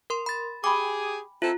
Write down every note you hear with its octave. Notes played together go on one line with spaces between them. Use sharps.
A#4 C6
B5 A6
G4 G#4 G5 G#5 B5 D6
C4 E4 F4 A4 D#5